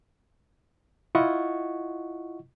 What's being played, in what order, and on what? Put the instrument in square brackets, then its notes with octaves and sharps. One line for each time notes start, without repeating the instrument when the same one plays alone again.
[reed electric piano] E4 F4 D#5 F#5 C#6